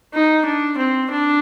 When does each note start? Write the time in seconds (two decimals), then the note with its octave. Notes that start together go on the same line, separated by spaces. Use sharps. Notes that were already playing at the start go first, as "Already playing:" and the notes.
0.14 D#4
0.45 D4
0.77 C4
1.11 D4